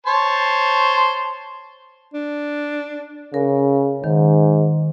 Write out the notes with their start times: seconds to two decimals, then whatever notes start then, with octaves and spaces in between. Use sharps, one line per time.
0.07 C5 C#5 A5
2.14 D4
3.34 C#3 A#4
4.04 G#2 D#3